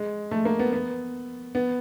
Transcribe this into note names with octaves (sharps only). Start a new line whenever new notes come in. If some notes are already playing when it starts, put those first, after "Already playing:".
Already playing: G#3
A3
A#3
B3
B3
B3